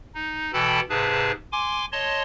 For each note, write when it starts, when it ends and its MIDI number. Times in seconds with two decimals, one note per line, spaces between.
0.14 0.51 63
0.53 0.80 47
0.53 0.80 52
0.53 0.80 69
0.53 0.80 79
0.53 0.80 81
0.53 0.80 83
0.90 1.32 44
0.90 1.32 48
0.90 1.32 68
0.90 1.32 71
0.90 1.32 81
1.52 1.85 80
1.52 1.85 84
1.52 1.85 86
1.92 2.23 73
1.92 2.23 75
1.92 2.23 81
1.92 2.23 84